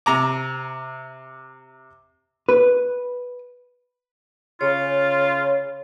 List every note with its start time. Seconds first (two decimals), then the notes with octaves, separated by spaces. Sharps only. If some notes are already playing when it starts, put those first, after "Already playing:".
0.06 C3 A#5 D6
2.49 B4
4.61 C#3 F4 C#5